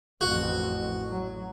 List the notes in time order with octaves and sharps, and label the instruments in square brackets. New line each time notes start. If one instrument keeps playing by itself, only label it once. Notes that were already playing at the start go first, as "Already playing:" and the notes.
[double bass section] A1 F2 [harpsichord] F#4
[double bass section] F#3